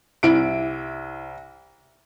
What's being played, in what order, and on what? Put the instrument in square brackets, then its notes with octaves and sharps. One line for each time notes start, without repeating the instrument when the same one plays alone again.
[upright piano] C2 E4 D7